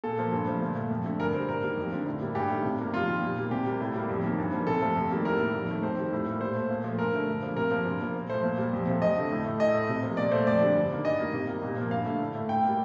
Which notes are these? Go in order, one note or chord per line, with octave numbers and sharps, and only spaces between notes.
A#2 A4
F3 A#3
G2
D3 F3 A3
A#2
A3
F2
D3 A3
G2 A#4
D3 G3 C5
G2 A#4
D#3 G3 A#3
F2
D3 F3
A2
G3 A#3
G2 G4
D#3 A3
C3
G3 A#3
F2 F4
D#3 G3
A#2
G3 A#3
C3 G4
G3 A#3
A2
G3 A#3
F2
D#3 A#3
G2
F3 A#3
C3 A4
F3 A3
F2
D#3 G3 A#3
A2 A#4
G3 A#3
F2
D#3 A3
F2 C5
D#3 G3
A2
G3 A#3
A#2 C5
A3
A#2
F3 A3
G2 A#4
D3 A3
G2
F3 A#3
C3 A#4
F3 A#3
G2
F3 A#3
A#2
F3 A3 C5
A#2
G3 A#3
F2
C3 F3 A3
F2 D#5
D3 A3
A2
A3
A2 D#5
A3
C3
F3 A#3
A#2 D5
A3 C5
F2 D5
D3 G3
G2
D#3 A#3
G2 D#5
D#3 G3 A#3
C3
G3 A#3
A#2
F3 A#3
G2 F5
D3 A3
A2
A3
A2 G5
A#3
G3